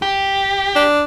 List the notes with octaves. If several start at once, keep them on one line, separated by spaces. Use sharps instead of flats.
G4
D4